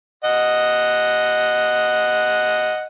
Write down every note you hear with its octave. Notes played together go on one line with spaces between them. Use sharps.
D#5 F#5